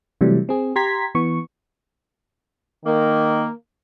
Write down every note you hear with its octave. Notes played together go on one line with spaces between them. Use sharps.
C3 E3 F#3 G3 A3
C4 G#4
G4 A#5 C6 G#6 B6
E3 B3 C#6
D#3 A#3